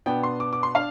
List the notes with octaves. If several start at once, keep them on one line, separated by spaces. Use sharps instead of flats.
B2 B3 D4 G5
C6
D6
D6
C6
D4 F5